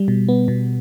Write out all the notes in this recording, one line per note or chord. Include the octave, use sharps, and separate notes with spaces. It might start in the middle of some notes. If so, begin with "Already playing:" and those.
Already playing: G3
B2
B3
B2